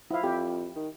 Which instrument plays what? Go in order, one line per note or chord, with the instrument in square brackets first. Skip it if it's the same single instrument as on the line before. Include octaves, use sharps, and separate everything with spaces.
[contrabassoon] F3 [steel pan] E4 F5
[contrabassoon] F2 [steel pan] G4
[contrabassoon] D#3